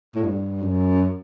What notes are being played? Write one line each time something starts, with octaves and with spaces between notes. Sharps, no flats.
A2
G2
F#2